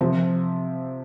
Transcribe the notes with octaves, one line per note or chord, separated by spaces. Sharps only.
C3 F3 C4